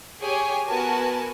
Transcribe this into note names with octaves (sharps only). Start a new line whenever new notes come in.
G4 G#4 C#5 G#5
B3 F#4 A#4 G#5 A5